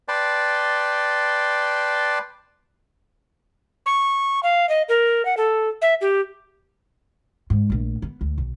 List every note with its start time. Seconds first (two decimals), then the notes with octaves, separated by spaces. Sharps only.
0.08 B4 D5 G5 A5 C6
3.86 C#6
4.43 F5
4.69 D#5
4.89 A#4
5.25 F#5
5.37 A4
5.82 E5
6.01 G4
7.50 G#2
7.70 A#1 A3
8.02 B3
8.21 D2
8.38 B1